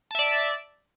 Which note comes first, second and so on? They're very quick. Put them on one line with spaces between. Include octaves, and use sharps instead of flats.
A5 E5 D5